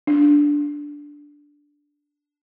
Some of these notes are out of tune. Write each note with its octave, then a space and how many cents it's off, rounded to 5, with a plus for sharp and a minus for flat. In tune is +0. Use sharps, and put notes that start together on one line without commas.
D4 -10